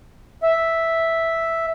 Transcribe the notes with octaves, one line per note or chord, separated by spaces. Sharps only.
E5